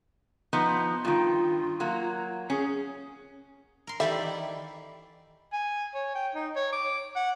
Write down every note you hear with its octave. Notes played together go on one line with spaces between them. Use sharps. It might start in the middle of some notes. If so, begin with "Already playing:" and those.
F3 B3 D#4
G2 D#3 F4
F#3 A#3
C#4 G#4
A#4 C6
D#3 E3 G3 A4 D5 E5
G#5
C#5
G5
D#4
C#5
D6
F#5